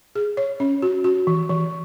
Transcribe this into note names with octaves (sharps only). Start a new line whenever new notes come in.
G#4
C#5
C#4
F#4
F#4
E3
E3